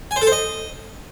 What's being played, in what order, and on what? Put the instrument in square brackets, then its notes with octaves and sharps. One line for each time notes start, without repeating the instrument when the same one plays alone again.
[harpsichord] G#5
C5
A4
C5
D#5